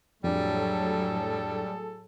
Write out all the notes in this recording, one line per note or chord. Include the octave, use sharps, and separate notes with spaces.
F2 A2 F#3 G3 D4 G#4 A4